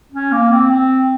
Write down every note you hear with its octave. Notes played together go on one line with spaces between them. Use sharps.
C#4
A#3
C4
C4